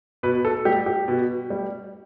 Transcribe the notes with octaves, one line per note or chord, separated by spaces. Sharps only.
B2 B4
A4
G3 G4
G4
B2
G3